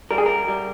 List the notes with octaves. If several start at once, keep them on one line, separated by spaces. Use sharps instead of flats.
G3 A#4
G#4
A#4
G3